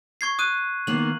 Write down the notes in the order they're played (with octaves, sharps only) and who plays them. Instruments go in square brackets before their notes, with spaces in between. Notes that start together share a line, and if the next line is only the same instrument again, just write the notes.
[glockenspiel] C#6 G#6 C7
D#6 F#6 D#7
[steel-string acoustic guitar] D#3 A#3 B3 [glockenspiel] F#7